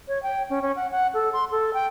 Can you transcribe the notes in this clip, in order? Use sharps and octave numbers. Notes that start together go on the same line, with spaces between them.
C#5
G5
C#4
C#4
F#5
F#5
A4
C6
A4
G5